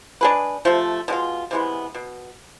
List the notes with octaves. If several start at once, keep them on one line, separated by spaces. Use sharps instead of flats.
G#3 D4 G#4 B4
C3 F3 A3
B2 G#3 D4 F4
C3 E3 G#3 B3
B2